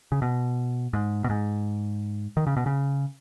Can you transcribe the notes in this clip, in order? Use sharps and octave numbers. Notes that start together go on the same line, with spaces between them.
C#3
B2
G#2
B2
G#2
D#3
C#3
B2
C#3